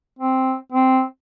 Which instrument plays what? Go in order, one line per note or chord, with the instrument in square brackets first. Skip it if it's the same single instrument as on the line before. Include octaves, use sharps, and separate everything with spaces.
[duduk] C4
C4